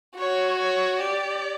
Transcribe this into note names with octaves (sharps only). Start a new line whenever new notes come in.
F#4 C#5
C#5
G4 D5